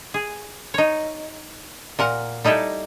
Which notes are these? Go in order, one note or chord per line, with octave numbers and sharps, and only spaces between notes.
G#4
D#4 C#5
A#2 A#4 F#5
G3 D#4 E4 G4 A4